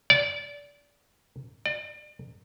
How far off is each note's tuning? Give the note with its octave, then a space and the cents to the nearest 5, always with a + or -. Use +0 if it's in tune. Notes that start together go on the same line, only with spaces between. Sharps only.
D5 -25
D5 +35